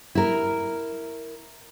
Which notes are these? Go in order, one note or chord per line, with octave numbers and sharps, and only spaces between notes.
E4 A#4